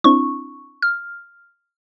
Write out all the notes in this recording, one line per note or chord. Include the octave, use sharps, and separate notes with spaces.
C4 D4 E4 C#6
F6